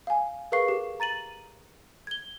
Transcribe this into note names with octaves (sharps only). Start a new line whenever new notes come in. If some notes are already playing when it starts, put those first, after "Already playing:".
F5 G#5
G#4 A#4 B4 F5 C#6 C7
G4
A#5 A6 D#7 F#7
G#6 G7